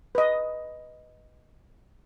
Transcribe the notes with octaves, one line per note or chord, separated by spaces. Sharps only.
B4 D#5